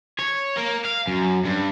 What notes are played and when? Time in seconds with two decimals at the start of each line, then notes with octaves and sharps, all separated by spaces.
0.19 C#5
0.58 A#3
0.85 F5
1.07 F#2
1.45 G2